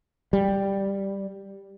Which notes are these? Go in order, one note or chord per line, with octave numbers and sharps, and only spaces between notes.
G3